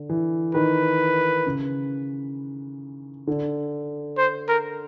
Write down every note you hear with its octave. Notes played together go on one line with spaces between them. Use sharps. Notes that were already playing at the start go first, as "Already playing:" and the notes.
Already playing: D3
E3
D#3 B4
C#3
D3
C5
A#4